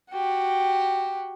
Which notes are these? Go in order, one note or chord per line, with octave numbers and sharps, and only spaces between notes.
F#4 G4